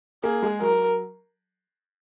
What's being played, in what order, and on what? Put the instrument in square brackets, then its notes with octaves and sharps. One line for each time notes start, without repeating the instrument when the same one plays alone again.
[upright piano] A#3 [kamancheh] G#4
[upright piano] G#3
[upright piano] F#3 [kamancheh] A#4